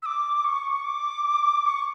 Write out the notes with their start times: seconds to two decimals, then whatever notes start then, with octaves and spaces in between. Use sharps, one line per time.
0.03 E6
0.06 D6
0.44 C#6
0.84 D6
1.67 C#6